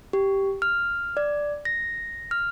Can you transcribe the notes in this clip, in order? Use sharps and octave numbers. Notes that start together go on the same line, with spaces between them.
G4
F6
D5
A#6
F6